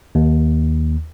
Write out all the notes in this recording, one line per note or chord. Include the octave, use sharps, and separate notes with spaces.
D#2